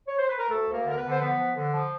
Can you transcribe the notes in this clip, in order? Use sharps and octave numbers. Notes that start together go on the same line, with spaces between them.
C#5
C5
B4
A#4
D2 A3 A4
D2
A#3 A#4
D3
A#4
B3 B4
D3
C5
F3 B3 B4
F3
D3
F3